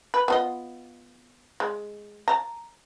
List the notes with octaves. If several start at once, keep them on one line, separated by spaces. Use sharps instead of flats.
B4
B3 F4 D#5
G#3
A5 A#5